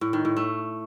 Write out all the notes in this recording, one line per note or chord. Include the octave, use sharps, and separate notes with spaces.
A2
D#3
A2
A3